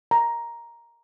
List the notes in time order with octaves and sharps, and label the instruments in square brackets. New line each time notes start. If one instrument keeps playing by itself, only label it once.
[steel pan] A#5